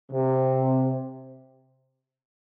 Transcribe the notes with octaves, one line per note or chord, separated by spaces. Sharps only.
C3